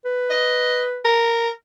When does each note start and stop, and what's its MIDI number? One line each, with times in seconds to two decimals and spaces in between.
0.05 1.02 71
0.30 0.81 75
1.05 1.49 70